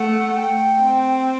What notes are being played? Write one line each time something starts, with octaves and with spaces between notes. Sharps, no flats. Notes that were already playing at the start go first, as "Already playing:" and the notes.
Already playing: A3 F#5
G5
C4